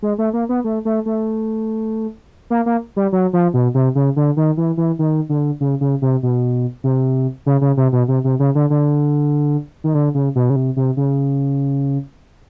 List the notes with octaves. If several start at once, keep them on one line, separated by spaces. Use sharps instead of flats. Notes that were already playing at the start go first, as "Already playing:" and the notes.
G#3
A3
A#3
B3
A3
A3
A3
A#3
A#3
G3
F#3
F3
B2
C3
C#3
D3
D#3
E3
E3
D#3
D3
C#3
C#3
C3
B2
C3
C#3
C#3
C3
B2
C3
C3
C#3
D3
D3
D#3
D3
C#3
B2
C#3
C3
C3
C#3